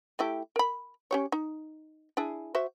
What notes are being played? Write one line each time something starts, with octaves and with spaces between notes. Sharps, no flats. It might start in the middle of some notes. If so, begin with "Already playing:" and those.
A3 E4 G4
A#4 B5
C#4 G4 C#5
D#4
D4 E4 G#4
F#4 C5 E5